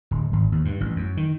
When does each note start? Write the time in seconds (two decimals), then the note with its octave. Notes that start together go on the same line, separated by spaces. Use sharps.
0.11 D1
0.33 G#1
0.52 D#2
0.65 G2
0.81 A1
0.96 F#2
1.17 D#3